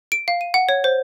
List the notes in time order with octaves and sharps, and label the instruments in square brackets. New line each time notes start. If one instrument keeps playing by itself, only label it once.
[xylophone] D7
F5
D#7
F#5
C#5
C5